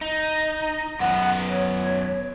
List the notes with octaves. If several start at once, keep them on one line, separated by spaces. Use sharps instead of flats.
D#4
F#2 B3 F#5
C#5